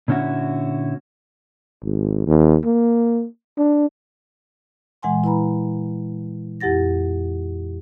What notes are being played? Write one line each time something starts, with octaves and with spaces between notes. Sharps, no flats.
A#2 D3 C#4 E4 F#4
G#1
D#2
A#3
D4
A#2 E3 G#3 F#5 G#5 C6
E4 B4 A#5 B5
F2 E4 G4 F#5 A6 A#6